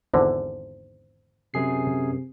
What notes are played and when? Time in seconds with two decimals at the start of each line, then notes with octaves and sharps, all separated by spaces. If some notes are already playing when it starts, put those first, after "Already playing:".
0.14 G#1 E2 D3 C5
1.54 F#2 C3 G#4 C7